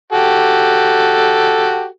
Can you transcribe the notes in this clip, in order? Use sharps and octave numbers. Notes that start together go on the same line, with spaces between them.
F#4 G4 A4